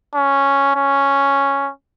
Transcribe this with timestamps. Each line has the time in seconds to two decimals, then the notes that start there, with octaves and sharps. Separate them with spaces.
0.15 C#4
0.75 C#4